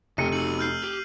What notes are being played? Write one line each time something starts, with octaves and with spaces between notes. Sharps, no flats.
F1 C#3 G5 C#7 D#7
D#4 F#4 E6 F#7
F6 G6 C7
G4